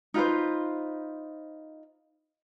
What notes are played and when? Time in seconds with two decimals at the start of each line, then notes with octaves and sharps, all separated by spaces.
0.14 D#4 F4 B4 C5